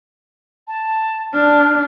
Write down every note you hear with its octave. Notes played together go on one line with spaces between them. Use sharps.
A5
D4 F6